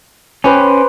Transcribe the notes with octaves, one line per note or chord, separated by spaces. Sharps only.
C#4 G4 B4 C5